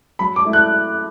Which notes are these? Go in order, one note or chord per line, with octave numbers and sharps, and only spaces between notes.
F#3 B5
D6
A3 E4
F#6